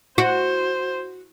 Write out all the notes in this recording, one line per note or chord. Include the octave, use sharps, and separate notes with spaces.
F#4 C5